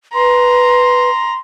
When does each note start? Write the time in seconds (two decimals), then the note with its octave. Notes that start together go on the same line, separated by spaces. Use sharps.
0.14 B4 A#5 C6